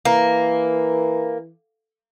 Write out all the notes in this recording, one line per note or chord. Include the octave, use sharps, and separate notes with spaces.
E3 A#3